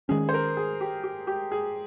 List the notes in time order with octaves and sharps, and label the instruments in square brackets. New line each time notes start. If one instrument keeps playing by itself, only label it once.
[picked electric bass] D#3 G#3 C#4 [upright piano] G#4
[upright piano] C5
A#4
G#4
G4
G4
G4
G#4